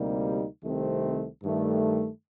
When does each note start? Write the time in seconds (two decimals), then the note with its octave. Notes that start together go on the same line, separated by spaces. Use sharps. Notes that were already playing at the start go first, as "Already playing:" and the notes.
Already playing: D2 C3 G3 A#3 D#4
0.62 C2 C3 D#3 A3 C4
1.43 G2 D#3 A3 D4